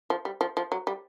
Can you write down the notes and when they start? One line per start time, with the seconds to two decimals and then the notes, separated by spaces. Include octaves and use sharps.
0.10 F3
0.25 G3
0.41 F3
0.57 F3
0.72 F#3
0.87 G3